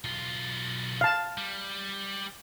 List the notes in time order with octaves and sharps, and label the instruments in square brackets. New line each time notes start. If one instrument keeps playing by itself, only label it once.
[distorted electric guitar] B1 F4
[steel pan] F5 A5
[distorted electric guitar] G3